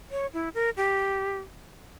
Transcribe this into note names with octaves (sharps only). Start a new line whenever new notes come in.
C#5
E4
A#4
G4